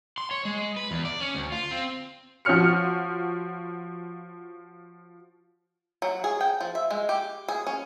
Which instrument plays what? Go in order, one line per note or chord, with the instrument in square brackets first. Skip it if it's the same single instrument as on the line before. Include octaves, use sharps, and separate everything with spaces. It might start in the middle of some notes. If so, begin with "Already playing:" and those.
[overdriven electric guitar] C6
C#5
G#3
B4
E2
D5
C#4
D2
F4
C4
[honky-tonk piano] F3 F#4 C#5 F6 C#7
[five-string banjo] F#3
G#4
G5
F3
E5
G#3
G4
G#4
C#4